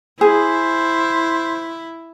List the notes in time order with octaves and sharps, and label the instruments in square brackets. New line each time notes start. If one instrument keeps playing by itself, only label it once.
[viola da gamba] E4 [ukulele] G#4 [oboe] C5